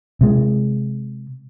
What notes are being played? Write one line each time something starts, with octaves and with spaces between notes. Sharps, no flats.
C3 G#3